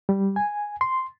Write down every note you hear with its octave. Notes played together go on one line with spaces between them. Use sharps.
G3
G#5
C6